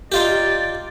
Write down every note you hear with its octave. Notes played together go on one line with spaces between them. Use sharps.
D#4 F4 G4 D5